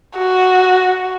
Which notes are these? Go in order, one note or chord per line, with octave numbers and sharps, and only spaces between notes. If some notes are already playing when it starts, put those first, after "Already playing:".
F#4